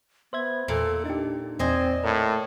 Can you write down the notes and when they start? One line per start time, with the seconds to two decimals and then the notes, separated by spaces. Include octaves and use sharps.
0.33 B3 C5 E5 G#6
0.68 E2 A#2 A4
1.05 D4 D#4 G4
1.59 E2 A#2 C4 C5 D5 D#5 G#5
2.04 A2 A#4